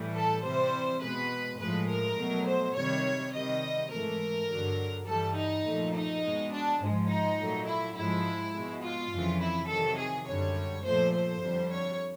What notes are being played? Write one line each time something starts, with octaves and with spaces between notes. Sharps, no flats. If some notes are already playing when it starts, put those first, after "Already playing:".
Already playing: A2 E3 G3
A4
C3 E3 G3 C5
B2 G#3 B4
A2 F3 G#3 B4
A#4
B2 F#3 A3
C5
C3 D#3 G3 C#5
C3 D#3 G3 D#5
G#2 E3 A3 A#4
G2 D3 F#3
G2 E3 G3 A4
D#4
A#2 F3 A3
D#4
B2 G#3
D4
G#2 F3 G#3
D#4
A#2 F#3 A3
E4
G#2 F3 G#3 E4
B2 G#3
F4
F2 C#3 E3
E4
C3 D#3 F#3 A4
G#4
F#2 D3 G3 C#5
A#2 F3 A3 C5
C5
F2 D3 G3
C#5